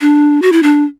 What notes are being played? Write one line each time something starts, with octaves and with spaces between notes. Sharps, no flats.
D4
F#4
E4
D4